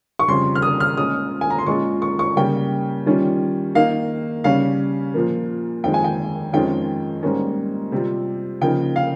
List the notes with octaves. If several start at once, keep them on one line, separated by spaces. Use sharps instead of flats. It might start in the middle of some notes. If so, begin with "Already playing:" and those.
C#6
F2 C#3 G3 C6
F6
D#6
F6
A#2 G#3 C#4 F4 D#6
G#5
A#5
C6
A#2 G#3 C#4 F4 C#6
C#6
C#6
C#3 G3 A#3 G5
D#3 G3 C#4 F4
D#3 A#3 D#4 F5
C#3 G3 C#4 F5
A#2 F3 A#3
F2 D#3 G#3 G5
G#5
G5
F2 D#3 G#3 C#4 F4 G5
G#2 G3 A#3 C#4
C3 G3 C4 F4
C#3 F3 A#3 D#4 G5
F5